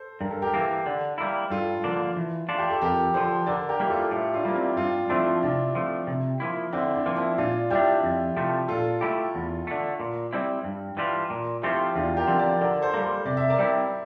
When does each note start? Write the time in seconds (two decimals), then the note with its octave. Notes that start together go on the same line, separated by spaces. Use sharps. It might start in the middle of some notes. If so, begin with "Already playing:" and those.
Already playing: A4 C5
0.20 G2 A#4
0.31 A4
0.42 G4 A#4
0.54 E3 A#3
0.86 D3
1.18 G3 A#3 E4
1.50 G2 F4 A4
1.84 D3 F3 A#3 D4
2.17 E3
2.49 A3 D4 F4
2.58 G4
2.71 A4
2.81 F2 G4 A#4
3.14 D3 F3 A4 C5
3.46 D3 A#4 D5
3.69 G4 A#4
3.80 G3 A#3 E4
3.90 F4 A4
4.11 A2 E4 G4
4.34 D4 F4
4.45 G3 A#3
4.55 C4 E4
4.77 G2 D4 F4
5.10 F3 A3 C4 D4 E4 F4
5.43 C3 D4
5.75 F3 A3
6.07 C3
6.40 F3 A#3 E4
6.73 D3 C4 E4
6.95 D4
7.06 F3 A#3
7.16 C4 E4
7.38 A#2 D4 F4
7.70 G3 D4 E4 G4
8.03 F2
8.37 C3 F3 A3
8.68 A#2 F4 A4
9.01 A3 E4 G4
9.35 E2
9.67 D3 A3
10.00 A#2
10.33 G3 C4 E4
10.64 G2
10.97 E3 G3 D4 F4
11.30 A#2
11.62 F3 A3 C4 E4 F4 G4
11.95 E2 D4 F4
12.17 G4 A#4
12.27 D3 F3 C4
12.39 A#4 D5
12.61 D3 A#4 D5
12.82 A4 C5
12.94 G3 A#3
13.03 A4 C5
13.25 C3 D5
13.37 E5
13.49 A#4 D5
13.59 G3 C4 E4